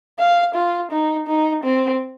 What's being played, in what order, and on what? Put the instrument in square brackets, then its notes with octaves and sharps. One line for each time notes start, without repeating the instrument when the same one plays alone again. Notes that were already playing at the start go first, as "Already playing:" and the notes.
[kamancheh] F5
F4
D#4
D#4
C4